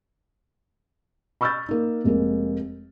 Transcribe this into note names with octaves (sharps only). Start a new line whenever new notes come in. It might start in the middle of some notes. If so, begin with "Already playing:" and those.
B5 C#6 E6 F6 G6 A6
A#3 D#4
F1 G#3 A#3